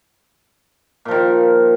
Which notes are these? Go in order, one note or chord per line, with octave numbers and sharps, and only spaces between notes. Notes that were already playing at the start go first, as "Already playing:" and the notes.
A#2 D#3 F3